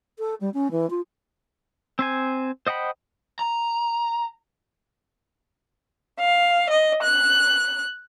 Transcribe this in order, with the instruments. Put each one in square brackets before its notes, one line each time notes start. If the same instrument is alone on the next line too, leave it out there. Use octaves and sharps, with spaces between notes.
[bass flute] A4
G3
C#4
E3
F4
[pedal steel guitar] C4 C5 G#5
C5 D#5 F#5 G5 B5
[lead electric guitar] A#5
[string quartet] F5
D#5
F#6